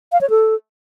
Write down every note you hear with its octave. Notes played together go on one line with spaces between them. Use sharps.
F5
C#5
A4